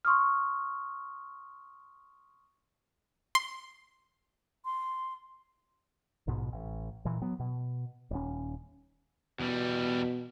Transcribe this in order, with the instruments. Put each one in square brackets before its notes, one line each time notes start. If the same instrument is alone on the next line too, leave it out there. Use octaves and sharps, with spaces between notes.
[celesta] C6 C#6 D#6 F6
[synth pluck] C6
[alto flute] C6
[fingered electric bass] A#1 G#2 B2
A1
A#2 E3
F#3 B3
B2
D#1 C#4
[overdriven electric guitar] E2 G3 [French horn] B2